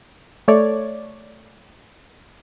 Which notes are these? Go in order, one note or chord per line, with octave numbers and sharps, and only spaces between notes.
A3 C#5 D5